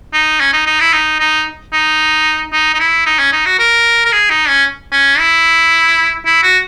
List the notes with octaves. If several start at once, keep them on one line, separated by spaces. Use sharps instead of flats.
D#4
C#4
D#4
D#4
E4
D#4
D#4
D#4
D#4
D#4
E4
D#4
C#4
D#4
F#4
A#4
A#4
G#4
D#4
C#4
C#4
E4
E4
F#4